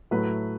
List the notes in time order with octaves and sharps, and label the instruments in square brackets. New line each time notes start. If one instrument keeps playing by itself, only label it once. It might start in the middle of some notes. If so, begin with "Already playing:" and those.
[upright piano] A2 F#3 A3 E4 B4